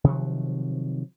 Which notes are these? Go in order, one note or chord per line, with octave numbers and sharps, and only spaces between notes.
C3 D#3 F3 F#3